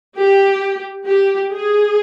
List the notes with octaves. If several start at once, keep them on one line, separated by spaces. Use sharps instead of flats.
G4
G4
G#4